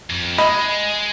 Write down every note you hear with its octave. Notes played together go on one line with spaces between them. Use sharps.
F2
G#3 D#5 B5